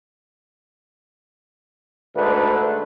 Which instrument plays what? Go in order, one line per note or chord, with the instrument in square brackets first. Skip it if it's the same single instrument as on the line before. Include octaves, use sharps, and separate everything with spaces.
[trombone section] D2 G#2 D3 A3 B4